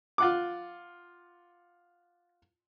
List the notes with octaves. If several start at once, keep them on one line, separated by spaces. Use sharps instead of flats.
F4 F#5 D6